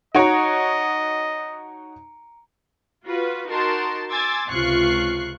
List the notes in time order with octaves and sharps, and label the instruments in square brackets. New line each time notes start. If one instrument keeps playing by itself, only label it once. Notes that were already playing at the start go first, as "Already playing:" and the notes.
[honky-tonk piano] D#4 F#4 C#5 [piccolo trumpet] D#5 [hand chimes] A#5 C#7 D7
[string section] F4 F#4 B4
D#4 F#4 A#4 A5 C6
G#5 C6 D6 E6 G#6 A6
C#2 C3 F4 C#6 F#6 C7